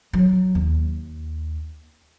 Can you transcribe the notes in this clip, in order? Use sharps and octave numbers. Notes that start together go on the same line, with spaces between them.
F#3
D#2